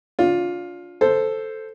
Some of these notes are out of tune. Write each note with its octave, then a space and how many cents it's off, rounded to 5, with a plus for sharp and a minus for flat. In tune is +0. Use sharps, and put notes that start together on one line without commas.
D4 -30 F4 +15
A4 +0 C5 +0